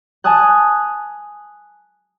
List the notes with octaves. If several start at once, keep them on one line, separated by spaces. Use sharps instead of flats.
G#5 A5 D#6 F#6